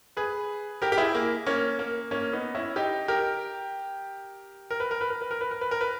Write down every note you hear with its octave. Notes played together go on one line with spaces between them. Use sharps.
G#4 B4
G4 A#4
G4
E4 G#4
A#3
A#3 C#4
A#3
A#3 C#4
B3 D#4
C#4 E4
D#4 G4
G4 A#4
A#4
B4
A#4
B4
A#4
B4
A#4
B4
A#4
B4
A#4
B4